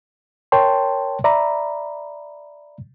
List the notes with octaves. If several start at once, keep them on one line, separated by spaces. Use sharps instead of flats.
A#4 C#5 G5 A5 C6
D5 E5 A#5 B5